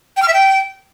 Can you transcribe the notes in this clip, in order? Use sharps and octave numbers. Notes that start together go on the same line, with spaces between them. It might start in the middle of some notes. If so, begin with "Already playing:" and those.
G5
F6
E5
G5